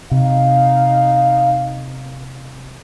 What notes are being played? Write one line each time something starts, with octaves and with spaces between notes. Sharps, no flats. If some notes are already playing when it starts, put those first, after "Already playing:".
C3 D#4 F5